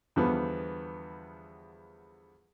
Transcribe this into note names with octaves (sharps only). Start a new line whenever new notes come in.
E2 D3 F3 G3 B3